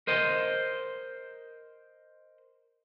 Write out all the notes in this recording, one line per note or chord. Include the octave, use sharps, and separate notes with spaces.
A#4 C5 D#5